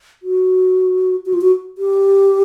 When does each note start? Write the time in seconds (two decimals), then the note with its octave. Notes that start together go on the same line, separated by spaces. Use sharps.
0.23 F#4
1.26 F#4
1.33 F4
1.41 F#4
1.78 G4